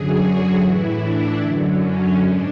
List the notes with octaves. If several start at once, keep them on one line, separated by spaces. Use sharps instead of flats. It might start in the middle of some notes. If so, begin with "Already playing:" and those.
Already playing: F#2 D3 F#3 G#4
F#4
A2 E3 E4
D4
F#2 D3 F#3
C#4
G#2 D4